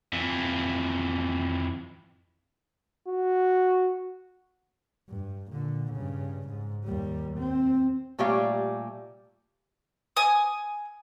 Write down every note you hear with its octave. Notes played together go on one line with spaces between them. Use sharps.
F2 E3
F#4
G2
A#2 D3
G2 C#3
G#2
D#2 G3
C4
A#2 G3 A3 G4 C#5 F5
G#5 D#6